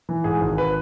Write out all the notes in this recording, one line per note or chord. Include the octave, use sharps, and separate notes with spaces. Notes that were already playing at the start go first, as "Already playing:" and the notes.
E3
G#2 G#4
G#1
B4